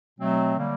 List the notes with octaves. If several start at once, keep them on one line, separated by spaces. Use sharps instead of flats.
B2 F#3 A3 C4
D3 G3 A#3